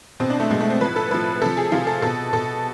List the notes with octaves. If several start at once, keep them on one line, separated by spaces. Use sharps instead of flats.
B2 C4
D4
A3
B2 G#3
A3
C4
A2 F3 B4
A4
A2 F3 B4
C3 F3 A4
G#4
C3 F3 F4
A4
B2 A4
B2 A4